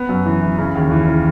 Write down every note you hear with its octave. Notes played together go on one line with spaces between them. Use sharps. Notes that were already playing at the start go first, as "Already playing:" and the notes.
Already playing: B3
F#2
E3
E3
C#3
D#2
E3
C#3